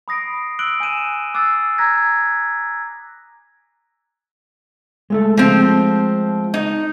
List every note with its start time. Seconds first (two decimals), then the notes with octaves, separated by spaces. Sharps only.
0.08 B5 D#6 A#6 C7 D7
0.59 E6 F#6 D7 F#7 G7
0.80 G#5 G6 D#7 E7
1.34 D6 E6 F#6 A6 C7
1.78 A#5 E6 F#6 G#6 A#6 B6
5.10 G#3 A3 A4
5.37 F3 C4
6.54 D#4